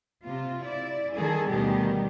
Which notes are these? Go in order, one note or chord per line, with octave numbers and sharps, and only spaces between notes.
C3 F4
E4 D5
D#3 G3 G#4 A4
D2 B2 D#3 G3 B3 G4